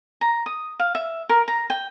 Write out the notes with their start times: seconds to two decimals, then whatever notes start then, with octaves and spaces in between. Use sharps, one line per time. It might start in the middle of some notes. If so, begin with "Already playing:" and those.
0.21 A#5
0.46 D#6
0.79 F5
0.95 E5
1.29 A#4
1.48 A#5
1.70 G5